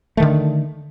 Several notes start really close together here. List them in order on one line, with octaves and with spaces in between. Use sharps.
A3 D#3 D3